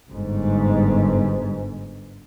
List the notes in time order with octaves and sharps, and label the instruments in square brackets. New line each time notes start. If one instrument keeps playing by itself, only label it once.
[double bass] G1 G#2